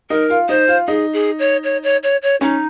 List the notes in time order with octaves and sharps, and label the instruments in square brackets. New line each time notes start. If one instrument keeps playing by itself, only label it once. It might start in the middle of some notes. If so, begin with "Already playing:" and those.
[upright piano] D#4 [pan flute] A#4
[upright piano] F4
[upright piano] D#4 [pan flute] C5
[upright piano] F4
[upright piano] D#4 [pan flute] G#4
[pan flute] G#4
C#5
C#5
C#5
C#5
C#5
[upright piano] C#4 [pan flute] D#4